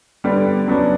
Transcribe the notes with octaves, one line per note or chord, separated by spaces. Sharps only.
D3 G3 B3 D5
C#3 F#3 B3 D4